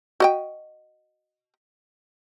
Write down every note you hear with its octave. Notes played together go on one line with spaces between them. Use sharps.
F#4 D#5 G5